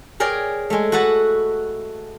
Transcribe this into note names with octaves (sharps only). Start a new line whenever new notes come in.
G#4 A#4 C#5 D5 G5
G#3 A3
F#4 A4 B4 F#5 A5